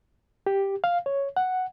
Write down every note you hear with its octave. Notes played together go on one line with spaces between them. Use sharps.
G4
F5
C#5
F#5